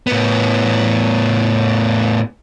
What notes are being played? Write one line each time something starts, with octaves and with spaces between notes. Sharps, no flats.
A2 B3